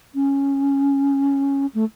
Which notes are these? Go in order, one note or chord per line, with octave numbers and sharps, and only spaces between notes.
C#4
A3